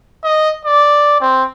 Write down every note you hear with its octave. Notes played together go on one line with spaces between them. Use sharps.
D#5
D5
C4